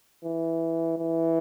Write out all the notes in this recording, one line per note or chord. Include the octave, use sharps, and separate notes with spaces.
E3
E3